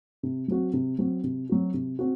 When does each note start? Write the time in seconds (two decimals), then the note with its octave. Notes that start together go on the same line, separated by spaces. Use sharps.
0.23 C3
0.48 F#3 C4 F#4
0.73 C3
0.99 F#3 C4 F#4
1.24 C3
1.49 F#3 C4 F#4
1.74 C3
1.99 C4 F#4